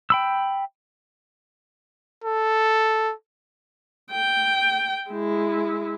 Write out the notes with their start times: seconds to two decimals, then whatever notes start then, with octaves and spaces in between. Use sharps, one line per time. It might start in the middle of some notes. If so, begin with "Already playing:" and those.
0.10 G5 B5 E6
2.24 A4
4.11 G5
5.11 G#3 E4